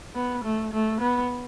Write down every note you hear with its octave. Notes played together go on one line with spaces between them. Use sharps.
B3
A3
A3
B3